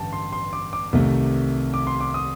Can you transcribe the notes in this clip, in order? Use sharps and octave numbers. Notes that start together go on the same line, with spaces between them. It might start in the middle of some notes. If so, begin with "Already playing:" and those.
Already playing: A1 G2 D3 G5 A5
C6
C6
D6
D6
C2 C3 D#3 A3
D6
C6
D6
D#6